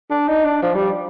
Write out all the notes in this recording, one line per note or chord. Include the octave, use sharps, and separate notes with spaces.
D4
D#4
D4
F3
G3